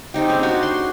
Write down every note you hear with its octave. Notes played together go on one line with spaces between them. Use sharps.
C4 D#4 G4
C#4 G#4
D4 F#4
C6